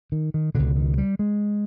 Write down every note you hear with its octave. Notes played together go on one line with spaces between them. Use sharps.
D#3
D#3
C#2 B2 D3
D#3
G3
G#3